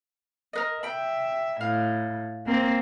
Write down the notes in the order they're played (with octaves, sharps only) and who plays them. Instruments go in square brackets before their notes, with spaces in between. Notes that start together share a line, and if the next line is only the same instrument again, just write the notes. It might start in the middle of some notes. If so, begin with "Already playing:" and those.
[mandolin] A#4 B4 D#5
[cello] E5 [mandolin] G5 B5
[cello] A2 [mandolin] F5
[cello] A#3 C4